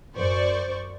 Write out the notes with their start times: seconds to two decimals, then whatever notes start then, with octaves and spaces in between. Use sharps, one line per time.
0.15 F#2 C5 D5 C#6